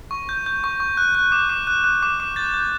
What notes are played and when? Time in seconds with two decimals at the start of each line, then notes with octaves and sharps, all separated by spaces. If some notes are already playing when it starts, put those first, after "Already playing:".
0.11 C#6
0.29 G6
0.46 G6
0.64 C#6
0.80 C#6
0.97 F#6
1.15 F#6
1.32 D6
1.49 D6
1.67 F#6
1.84 F#6
2.03 D6
2.20 D6
2.36 G6 A6
2.54 G6